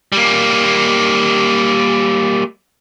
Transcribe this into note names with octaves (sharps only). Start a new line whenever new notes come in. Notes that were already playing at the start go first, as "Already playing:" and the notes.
G3 A#3